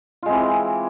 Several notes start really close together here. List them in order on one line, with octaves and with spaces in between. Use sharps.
F4 G#3 C4 E3